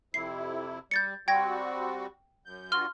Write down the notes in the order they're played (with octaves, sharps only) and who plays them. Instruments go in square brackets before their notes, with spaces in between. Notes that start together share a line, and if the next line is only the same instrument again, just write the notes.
[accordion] F2 C3 E4 [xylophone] C7
[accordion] G3 [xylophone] G6 A6 C#7
[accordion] G3 C4 F#4 [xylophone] G5 G#6 A#6
[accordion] F#2 G6
[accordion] G2 F4 F#4 [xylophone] C6 F6 G7